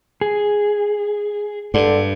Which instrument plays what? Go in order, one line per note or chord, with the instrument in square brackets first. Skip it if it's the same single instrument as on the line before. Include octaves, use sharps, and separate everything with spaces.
[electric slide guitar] G#4
[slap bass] G2 [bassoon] D3